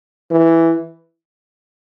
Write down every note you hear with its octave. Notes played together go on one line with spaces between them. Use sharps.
E3